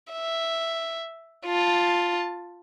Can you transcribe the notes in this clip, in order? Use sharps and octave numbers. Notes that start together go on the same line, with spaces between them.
E5
F4 A5